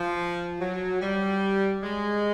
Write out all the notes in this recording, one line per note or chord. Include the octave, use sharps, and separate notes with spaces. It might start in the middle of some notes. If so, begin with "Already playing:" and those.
Already playing: F3
F#3
G3
G#3